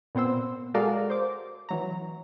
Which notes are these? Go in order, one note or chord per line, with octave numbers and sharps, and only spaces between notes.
A#2 B3 C4 C5 E6
G#3 F#4 A4 A#4 D5 F5
C5 D6
E3 F#3 A#5